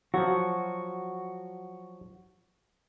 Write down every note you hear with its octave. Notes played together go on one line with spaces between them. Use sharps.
F3 F#3 F#4